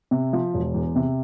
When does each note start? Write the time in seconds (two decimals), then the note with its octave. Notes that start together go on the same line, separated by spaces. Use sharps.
0.11 C3
0.33 F3
0.54 E1
0.74 E2
0.95 C3